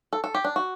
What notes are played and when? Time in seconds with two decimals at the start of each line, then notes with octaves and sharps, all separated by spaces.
0.13 A4
0.24 A4
0.34 G4
0.44 D4
0.56 F#4